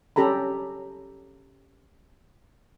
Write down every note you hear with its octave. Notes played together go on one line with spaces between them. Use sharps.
C#4 G4 A4 A#5 B5